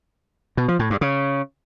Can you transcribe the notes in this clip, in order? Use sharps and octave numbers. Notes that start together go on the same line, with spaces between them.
B2
F3
A2
G2
C#3